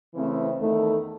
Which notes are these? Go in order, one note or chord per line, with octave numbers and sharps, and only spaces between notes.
C#3 E3 A3 C4 E4
E2 D#3 A3